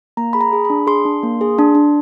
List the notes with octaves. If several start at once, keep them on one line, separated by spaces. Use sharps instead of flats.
A#3 A#5
G#4 B5
A#5
G#4
B5
D4
G#4 C6
D4
A#3
G#4
D4
D4